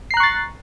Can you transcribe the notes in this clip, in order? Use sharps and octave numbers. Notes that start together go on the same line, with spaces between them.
A#5 C#6 F#6 A6 C7